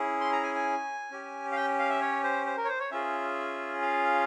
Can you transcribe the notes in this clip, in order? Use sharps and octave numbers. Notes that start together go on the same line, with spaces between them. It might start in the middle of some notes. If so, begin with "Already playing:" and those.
Already playing: C#4 E4 G#4
C6
A#5
G#5
G#5
C#4 G4
F5
G5
F5
E5
C#5
C5
C5
A#4
C#5
C5
C#5
C#4 F4 G#4 E5
F5